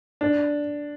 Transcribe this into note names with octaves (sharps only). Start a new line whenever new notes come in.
D4